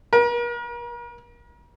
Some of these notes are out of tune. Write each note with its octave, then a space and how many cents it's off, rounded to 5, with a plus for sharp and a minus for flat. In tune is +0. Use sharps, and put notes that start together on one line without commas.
A#4 +45